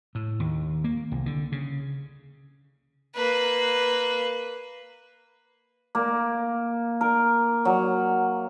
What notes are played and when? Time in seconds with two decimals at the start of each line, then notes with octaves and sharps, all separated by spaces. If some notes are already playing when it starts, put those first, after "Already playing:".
0.15 A2
0.40 D#2
0.84 A#3
1.12 C2
1.26 D3
1.52 C#3
3.15 A#3 B4
5.95 A#3
7.01 A#4
7.65 F#3